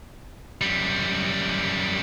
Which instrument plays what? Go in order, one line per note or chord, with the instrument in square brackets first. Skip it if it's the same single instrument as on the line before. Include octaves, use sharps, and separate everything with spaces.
[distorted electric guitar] F#2 G3